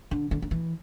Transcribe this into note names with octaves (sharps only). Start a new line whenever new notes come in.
D3
D3
D3
E3